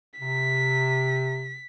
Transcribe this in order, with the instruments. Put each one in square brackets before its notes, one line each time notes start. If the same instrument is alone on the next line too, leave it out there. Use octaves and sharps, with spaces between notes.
[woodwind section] C3 [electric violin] B6